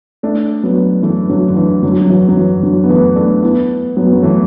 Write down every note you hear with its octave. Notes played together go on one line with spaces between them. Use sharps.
A3 D4
F#3 B3
E3 A3
D3 F#3
D3
E3
D3 F#3
F#3
E3
F#3
E3
D3 F#3
B3
E3 A3
A3 D4
B3 E4
F#3 B3
F#3
E3 A3